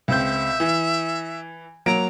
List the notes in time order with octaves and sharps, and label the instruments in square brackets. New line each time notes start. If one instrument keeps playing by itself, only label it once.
[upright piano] C#2 C4 G6 [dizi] E5
[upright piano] E3
[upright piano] F#3 A#3 D7 [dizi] A#5